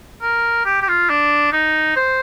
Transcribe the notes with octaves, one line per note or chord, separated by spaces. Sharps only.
A#4
G4
G4
F4
D4
D#4
C5